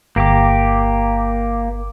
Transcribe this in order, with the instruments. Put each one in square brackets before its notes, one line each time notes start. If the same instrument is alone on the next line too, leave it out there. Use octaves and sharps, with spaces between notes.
[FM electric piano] G1 D6 [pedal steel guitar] A#3 G4